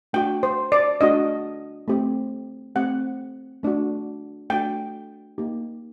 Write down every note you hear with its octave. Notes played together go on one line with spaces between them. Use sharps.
A3 D4 F#4 G5
C5
D5
A3 D4 F#4 D#5
A3 C4 G4
A3 C4 G4 F#5
A3 D4 F#4
A3 D4 F#4 G5
A#3 D#4 G4